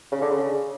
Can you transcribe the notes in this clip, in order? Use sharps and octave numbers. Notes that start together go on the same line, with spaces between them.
C#3
D3
C#3